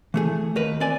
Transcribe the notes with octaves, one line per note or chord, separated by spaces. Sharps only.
E3 A3 G#4
D#2 A#4 B4
C4 D5 G#5